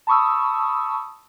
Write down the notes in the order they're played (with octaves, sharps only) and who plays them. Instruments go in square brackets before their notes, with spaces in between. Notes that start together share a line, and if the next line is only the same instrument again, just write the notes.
[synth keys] A5 B5 C#6 D#6 E6